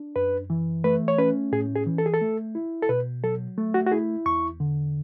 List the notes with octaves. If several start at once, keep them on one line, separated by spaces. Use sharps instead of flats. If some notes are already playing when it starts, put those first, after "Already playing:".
Already playing: D4
F#2 B4
E3
A3 B4
C#5
C#4 B4
A2 G#4
G#4
E3
A4
G#4
A4
A3
E4
A4
B2 B4
F#3 A4
A3
F#4
F#4
E4 G#4
E2 C#6
D3